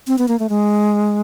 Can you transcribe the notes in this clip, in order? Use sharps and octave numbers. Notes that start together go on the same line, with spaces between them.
C4
B3
A#3
A3
G#3